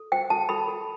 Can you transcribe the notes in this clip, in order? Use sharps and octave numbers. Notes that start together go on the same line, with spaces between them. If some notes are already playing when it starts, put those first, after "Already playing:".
Already playing: A4
C5 G5
A4 A5
A4 B5
A4